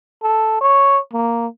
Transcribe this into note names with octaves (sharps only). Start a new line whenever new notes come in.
A4
C#5
A#3